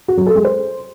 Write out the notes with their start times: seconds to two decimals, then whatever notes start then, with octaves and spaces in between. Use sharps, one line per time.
0.08 F#4
0.17 F#3
0.26 A4
0.36 G#3
0.45 C5